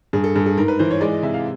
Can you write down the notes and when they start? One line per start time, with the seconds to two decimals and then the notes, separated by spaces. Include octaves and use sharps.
0.13 G2 G#4
0.24 A4
0.36 G2 G#4
0.46 G#4
0.57 G#2 A#4
0.68 B4
0.79 E3 C5
0.91 C#5
1.01 G#3 D5
1.12 D#5
1.23 C3 E5
1.34 F5